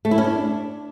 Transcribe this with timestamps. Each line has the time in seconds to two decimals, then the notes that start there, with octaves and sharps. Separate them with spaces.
0.05 A3
0.11 E4
0.18 C#4
0.24 D4